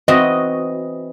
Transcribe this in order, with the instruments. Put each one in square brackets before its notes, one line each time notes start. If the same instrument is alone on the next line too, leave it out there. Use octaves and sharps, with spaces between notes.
[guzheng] E3 C4 F#4 [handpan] D#5